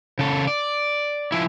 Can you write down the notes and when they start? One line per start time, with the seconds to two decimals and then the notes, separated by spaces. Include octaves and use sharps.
0.19 C#3 A4
0.47 D5
1.32 F3 E4